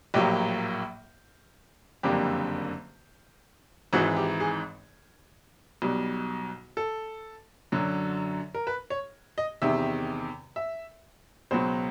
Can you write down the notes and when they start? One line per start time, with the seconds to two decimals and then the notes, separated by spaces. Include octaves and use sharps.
0.14 A#1 A2 F#3 A#3 G4
2.03 F#1 F2 D3 G3 A#3 G4
3.93 G#1 G#2 E3 F#4
4.17 G4
4.40 G#4
5.82 B1 B2 G3
6.77 A4
7.72 F#2 D3 F#3
8.54 A#4
8.67 B4
8.90 C#5
9.38 D#5
9.62 E2 C3 D#3 E5
10.56 E5
11.51 C#2 B2 F#3 C5